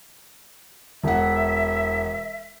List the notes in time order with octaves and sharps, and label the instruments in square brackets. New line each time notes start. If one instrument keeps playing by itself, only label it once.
[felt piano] E1 F#5 [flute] E5